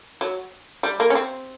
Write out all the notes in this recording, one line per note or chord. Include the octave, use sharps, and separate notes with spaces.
F#3
G3
A#3
C#4
C4